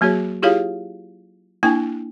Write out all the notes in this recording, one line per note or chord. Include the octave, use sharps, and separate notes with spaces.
F#3 A#3 F#4 G#4 C#5
E4 F4 G4 G#4 C#5 F5
A#3 D4 E4 G5 G#5